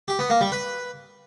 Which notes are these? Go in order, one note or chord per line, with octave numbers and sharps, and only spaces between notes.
G4
B3
A#3
G3
B4